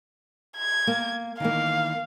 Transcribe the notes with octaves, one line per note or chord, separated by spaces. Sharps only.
G#6
A#3
D#3 E3 A#3 F5